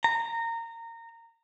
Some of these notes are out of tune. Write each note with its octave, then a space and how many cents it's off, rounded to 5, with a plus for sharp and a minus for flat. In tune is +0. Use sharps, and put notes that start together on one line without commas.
A#5 -20